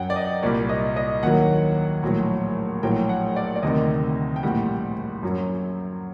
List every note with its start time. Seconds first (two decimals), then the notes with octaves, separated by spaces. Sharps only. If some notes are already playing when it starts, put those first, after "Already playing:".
Already playing: F#2 F#3 F#5 G5
0.10 D5
0.16 D#5
0.43 C2 A#2 G3 D5
0.69 D#5
0.96 D#5
1.23 D#2 D#3 F#3 F#5
2.03 A#1 A2 F#3
2.83 A#1 A2 F#3 G5
3.09 F#5
3.36 D5
3.56 D5
3.63 D2 C3 D#3 D#5
4.36 G5
4.43 A#1 A2 G3 F#5
5.23 F#2 F#3